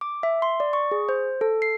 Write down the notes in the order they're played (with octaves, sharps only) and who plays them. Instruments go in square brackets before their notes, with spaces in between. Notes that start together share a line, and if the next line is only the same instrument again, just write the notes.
[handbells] D6
E5
C6
D5
C#6
G#4
C5
A4
C7